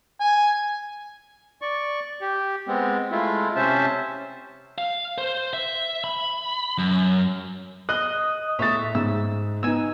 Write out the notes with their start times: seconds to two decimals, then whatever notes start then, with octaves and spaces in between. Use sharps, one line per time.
0.20 G#5
1.62 D5 C#6
2.21 G4
2.68 G#3 B3 C4
3.12 G#3 A3 E4 F4
3.56 C3 C#4 C5 E5 A5
4.78 F5
5.18 C5
5.53 E5
6.04 B5
6.78 F#2
7.89 D#5 F#6
8.59 A2 C#5 E5 D#6 A6
8.95 G#2 E6
9.63 B3 D#4 G#5 E6